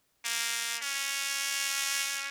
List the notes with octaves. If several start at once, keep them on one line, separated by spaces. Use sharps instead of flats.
A#3
C#4